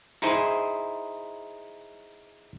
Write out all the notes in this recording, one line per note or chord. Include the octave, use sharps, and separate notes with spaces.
D#4 E4 G#4 C5